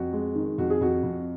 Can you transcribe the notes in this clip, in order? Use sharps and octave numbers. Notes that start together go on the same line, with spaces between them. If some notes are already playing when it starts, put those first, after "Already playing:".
Already playing: F2 F#4
G#3
D#3
F2 F#4
G#4
F2 F#4
F2